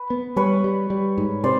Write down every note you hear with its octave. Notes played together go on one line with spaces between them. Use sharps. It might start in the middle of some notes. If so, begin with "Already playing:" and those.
Already playing: B4
B3
G3 B4 C#5
G3
G3
G#2
C3 C5 D5